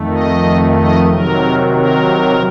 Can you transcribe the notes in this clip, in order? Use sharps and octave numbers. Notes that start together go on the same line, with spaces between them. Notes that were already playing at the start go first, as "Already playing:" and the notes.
Already playing: F2 D#3 A3
D#5
D#5
C3 D#3 F#3 A#4
A#4